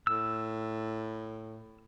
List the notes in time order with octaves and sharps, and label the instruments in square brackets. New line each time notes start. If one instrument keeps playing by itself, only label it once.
[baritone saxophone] A2 [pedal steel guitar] E6